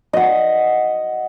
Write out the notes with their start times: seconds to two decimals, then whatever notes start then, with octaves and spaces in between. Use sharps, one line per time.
0.13 D#5 F#5